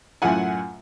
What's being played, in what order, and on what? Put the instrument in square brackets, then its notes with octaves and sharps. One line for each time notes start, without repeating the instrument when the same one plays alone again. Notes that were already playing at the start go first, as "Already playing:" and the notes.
[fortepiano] F#2 A2 F4 F#5 G#5